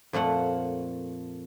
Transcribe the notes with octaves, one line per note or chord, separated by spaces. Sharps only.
F2 A#2 A3 F#5